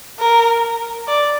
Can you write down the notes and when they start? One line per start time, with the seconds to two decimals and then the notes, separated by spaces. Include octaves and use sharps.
0.19 A#4
1.08 D5